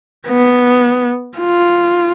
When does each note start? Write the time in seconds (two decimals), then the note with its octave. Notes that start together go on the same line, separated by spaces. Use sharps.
0.28 B3
1.38 F4